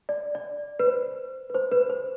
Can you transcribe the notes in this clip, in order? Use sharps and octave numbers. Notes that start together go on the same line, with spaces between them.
D5
D5
B4
C5
B4
C5
B4
C5